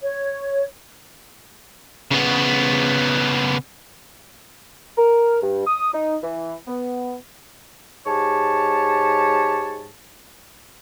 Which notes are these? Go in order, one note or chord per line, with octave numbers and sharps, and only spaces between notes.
C#5
C#3 B3
A#4
G2
D#6
D#4
E3
B3
G#2 G4 C#5 A5